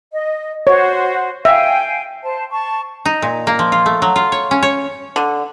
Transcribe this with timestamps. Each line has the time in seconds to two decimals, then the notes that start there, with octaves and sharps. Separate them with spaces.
0.13 D#5
0.67 F#4 C5 C#5
1.45 E5 F5 G5 G#5
2.23 C5 A5
2.50 A5 C#6
3.05 D#4
3.22 A#2
3.47 A#3
3.59 F3
3.72 F4
3.86 A3
4.02 F#3
4.16 F4
4.32 C#5
4.51 C#4
4.62 C#5
5.16 D3